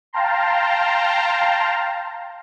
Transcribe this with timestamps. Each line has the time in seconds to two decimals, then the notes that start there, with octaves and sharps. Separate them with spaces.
0.13 F5 G5 A5 A#5 C6